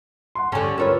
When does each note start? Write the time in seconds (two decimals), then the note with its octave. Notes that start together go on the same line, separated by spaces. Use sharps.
0.35 F#5 C6
0.52 D3 C#4 G4 G#5
0.78 D2 F4 A#4 B4 C#5 E5